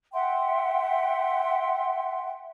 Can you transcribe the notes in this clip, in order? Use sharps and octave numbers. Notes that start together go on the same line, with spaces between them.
E5 F#5 G5 C6